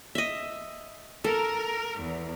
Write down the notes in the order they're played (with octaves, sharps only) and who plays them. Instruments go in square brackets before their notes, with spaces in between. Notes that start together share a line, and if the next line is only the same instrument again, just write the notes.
[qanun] D#5 E5
[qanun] A4 [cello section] A#4
[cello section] E2